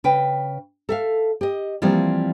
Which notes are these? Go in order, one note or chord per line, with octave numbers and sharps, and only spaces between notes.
C#3 B4 G5
A4 E5 F5
G4 D#5
E3 F3 G3 A#3 C4